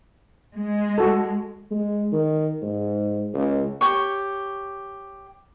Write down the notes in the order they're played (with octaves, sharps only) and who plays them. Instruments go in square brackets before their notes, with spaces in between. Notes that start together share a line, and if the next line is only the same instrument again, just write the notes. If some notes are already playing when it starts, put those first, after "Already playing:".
[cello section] G#3
[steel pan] F#4 A4
[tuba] G#3
D#3
G#2
C#2
[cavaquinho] G4 C#5 C#6